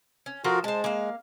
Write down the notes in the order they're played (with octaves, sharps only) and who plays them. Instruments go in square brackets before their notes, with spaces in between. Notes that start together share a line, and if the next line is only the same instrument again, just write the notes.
[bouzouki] C#4
[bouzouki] F3 F4 A4 [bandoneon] F#4 A#4
[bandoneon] G#3 [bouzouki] C5 A5
[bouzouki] A#3 F5